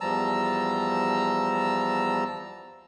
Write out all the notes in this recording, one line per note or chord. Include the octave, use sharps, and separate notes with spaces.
E2 F3 G3 A5 A#5 E6